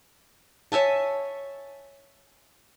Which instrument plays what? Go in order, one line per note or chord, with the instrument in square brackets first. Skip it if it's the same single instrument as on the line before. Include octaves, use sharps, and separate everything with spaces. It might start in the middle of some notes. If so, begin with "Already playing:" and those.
[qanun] C#5 E5 G#5 A5